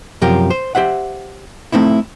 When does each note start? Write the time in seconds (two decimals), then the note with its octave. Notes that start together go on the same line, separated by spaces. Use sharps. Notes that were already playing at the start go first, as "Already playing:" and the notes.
0.22 F#2 C3 F3 G4 A#4
0.50 C5
0.75 G4 C5 E5 F#5
1.72 A3 C4 D#4 E4